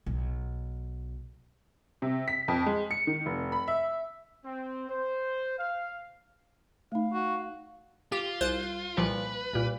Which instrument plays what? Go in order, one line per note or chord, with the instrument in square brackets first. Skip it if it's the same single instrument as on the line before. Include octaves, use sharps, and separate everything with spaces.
[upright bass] B1
[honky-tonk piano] C3
B6
F2
G#3
C#7
D#3
F1
B5
E5
[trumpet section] C4
C5
F5
[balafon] A3 D#4 [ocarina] F5
[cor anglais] F#4
[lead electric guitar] F4 [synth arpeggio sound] G4
[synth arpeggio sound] C2 C5 F#6
[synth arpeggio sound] C2 A#2 F3 [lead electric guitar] B4
[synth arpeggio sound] C2 A#2